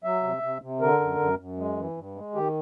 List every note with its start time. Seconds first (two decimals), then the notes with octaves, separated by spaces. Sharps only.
0.04 F#3 E5
0.23 C3
0.43 C3
0.62 C3
0.81 D3 A#4
1.00 F#2
1.19 F#2
1.39 F#2
1.58 G#3
1.77 E3
1.97 G2
2.16 G#3
2.35 D#3 G4